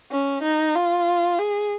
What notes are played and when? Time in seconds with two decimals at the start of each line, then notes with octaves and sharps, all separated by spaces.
0.11 C#4
0.43 D#4
0.75 F4
1.38 G#4